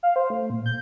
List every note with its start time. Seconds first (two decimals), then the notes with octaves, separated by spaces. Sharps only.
0.03 F5
0.16 C5
0.30 A3
0.50 A#2
0.66 G6